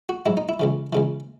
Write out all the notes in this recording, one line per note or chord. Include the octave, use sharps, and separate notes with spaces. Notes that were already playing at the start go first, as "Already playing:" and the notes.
F#4
G#2 F#3 E4
D#4
E4
C#2 C#3 E3
C#2 C#3 E3